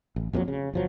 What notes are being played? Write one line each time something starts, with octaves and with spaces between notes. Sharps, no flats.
A1
A#1 F2 A#2 F#3
C#3
G1 F3 F#3